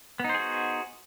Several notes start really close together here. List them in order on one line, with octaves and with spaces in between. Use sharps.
B3 D#4 C5 G#4 F#4